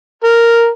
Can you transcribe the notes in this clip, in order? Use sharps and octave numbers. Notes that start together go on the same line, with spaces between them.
A#4